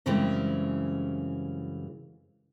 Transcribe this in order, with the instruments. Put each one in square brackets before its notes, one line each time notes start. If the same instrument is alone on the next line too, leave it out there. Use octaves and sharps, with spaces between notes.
[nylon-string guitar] F#2 C#3 E3 G3 G#3 C4